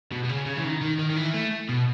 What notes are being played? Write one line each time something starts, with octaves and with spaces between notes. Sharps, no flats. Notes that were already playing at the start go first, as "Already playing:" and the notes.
B2
B2
C#3
C#3
E3
D#3
D#3
D#3
D#3
E3
A3
B2